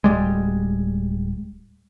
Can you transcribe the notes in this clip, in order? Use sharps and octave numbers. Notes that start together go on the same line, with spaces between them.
D1 C2 G3 G#3